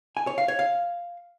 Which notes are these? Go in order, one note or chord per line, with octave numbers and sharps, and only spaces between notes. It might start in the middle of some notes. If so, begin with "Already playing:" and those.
G#5
C#5
F5
C#5
F5